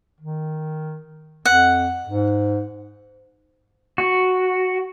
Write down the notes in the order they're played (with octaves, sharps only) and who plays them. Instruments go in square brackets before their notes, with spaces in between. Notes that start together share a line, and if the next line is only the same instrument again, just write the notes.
[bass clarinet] D#3
[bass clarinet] F2 [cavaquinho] F#5
[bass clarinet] G#2
[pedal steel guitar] F#4